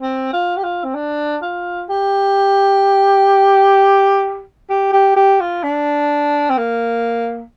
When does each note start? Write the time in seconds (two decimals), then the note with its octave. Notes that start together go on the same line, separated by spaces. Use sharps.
0.01 C4
0.33 F4
0.57 G4
0.63 F4
0.84 C4
0.95 D4
1.42 F4
1.89 G4
4.70 G4
4.93 G4
5.16 G4
5.40 F4
5.63 D4
6.50 C4
6.58 A#3